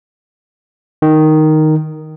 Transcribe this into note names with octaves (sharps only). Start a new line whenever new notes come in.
D#3